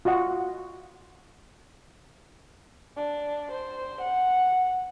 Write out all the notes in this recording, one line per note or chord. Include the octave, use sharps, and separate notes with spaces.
F4 F#4 D#5 F#5
D4
C5
F#5